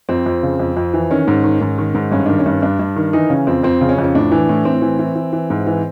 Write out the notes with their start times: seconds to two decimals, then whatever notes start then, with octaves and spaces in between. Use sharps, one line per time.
0.09 F2 C4
0.26 F2
0.43 C#3
0.60 F2
0.77 F2
0.94 E3
1.11 D#3 C#4
1.28 G#2
1.44 D#3
1.61 G#2
1.78 D#3
1.95 G#2
2.12 G2 C#4
2.26 D#3 D4
2.39 C#4
2.46 G2
2.62 G2 D4
2.79 G2
2.96 D#3
3.13 E3 D#4
3.30 C#3 C#4
3.47 F2 C4
3.63 F2 C4
3.81 C#3
3.89 C#4
3.98 F2
4.04 C#4
4.15 A2 D4
4.32 E3
4.49 A2
4.65 A2 C4
4.82 E3
4.99 E3
5.16 E3
5.33 E3
5.50 G#2
5.67 E3